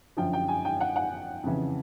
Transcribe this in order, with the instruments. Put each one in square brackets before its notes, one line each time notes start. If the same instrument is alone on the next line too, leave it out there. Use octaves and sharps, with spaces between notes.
[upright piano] F#2 D3 F3 G5
G5
G#5
G5
F#5
F#5
F2 C#3 E3